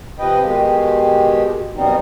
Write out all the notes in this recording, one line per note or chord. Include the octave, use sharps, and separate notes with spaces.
C3 F3 B4 D#5 G5
B2 D#3 G#3 G4
F#2 B2 G3 B3 C4 D#4